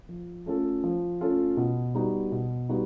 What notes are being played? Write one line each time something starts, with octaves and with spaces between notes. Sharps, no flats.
F3
A3 C#4 F4 A4
F3
A3 C#4 F4 A4
B2
G3 B3 D#4 F#4
B2
G3 B3 D#4 F#4